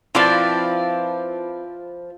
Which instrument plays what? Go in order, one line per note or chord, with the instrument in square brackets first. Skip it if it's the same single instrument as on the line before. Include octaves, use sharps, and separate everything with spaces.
[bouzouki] F3 [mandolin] C4 B4 A5 [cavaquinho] E4 F4 D5